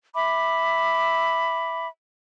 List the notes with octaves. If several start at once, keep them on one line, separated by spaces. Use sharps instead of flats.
E5 B5 D6